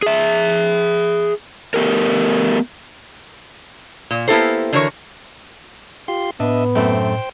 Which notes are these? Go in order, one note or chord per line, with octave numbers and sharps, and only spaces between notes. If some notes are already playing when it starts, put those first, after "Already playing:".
G#4 E5
A3 B3 G4 A#4
A#2
A#3 B3 E4 G4 A4 C5
D3 E3 D4 F#4 A#4 C#5
F4 G4 C6
A2 B3 D4 D#5 E5
F#2 A3 C4 C5 G5